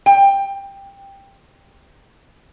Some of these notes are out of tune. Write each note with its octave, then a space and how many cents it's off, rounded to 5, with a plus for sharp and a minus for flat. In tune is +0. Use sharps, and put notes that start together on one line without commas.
G5 +10